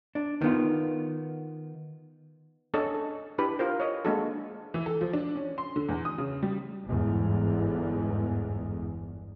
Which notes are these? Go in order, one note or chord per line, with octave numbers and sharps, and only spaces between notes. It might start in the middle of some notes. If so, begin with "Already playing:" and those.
D4
D#3 B3 F4
C#4 D4 A4 C#5 D#5 A5
A4
D4 E4 G4 B4 B5
F4 A#4 C5
C#5 D#5
G#3 A#3 D4 F#4 A4
E3
A4
F3
D4
C#4
C6
D3
E2
D#6
C#3
G3
G1 E2 G#2